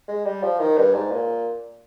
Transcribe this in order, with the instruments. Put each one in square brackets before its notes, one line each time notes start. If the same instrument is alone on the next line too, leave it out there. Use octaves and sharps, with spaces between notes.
[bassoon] G#3
G3
F3
D#3
G2
G#2
A#2